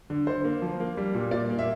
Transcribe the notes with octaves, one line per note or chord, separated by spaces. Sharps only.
D3
D3 C5
A#3
F3
A#3
G3
A#2
A#2 D5
A#3
E5